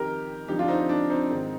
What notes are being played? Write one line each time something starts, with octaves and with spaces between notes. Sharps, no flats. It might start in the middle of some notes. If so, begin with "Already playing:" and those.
Already playing: F2 D#3 G4 A#4
F2 D3 F3 D#4 G4
D4 F4
C4 D#4
C4
D4
C4 D#4
G#2 D#3